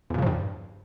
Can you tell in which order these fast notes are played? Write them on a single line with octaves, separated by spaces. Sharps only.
E2 A#2 C#3 F3 G2